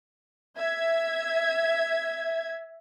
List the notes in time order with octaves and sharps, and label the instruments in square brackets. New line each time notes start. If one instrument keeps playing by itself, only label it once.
[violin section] E5 G#6